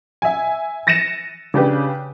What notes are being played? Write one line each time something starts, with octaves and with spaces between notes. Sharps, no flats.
E5 G#5
A6 A#6 C#7 D#7 E7
C#3 D4 G4 B4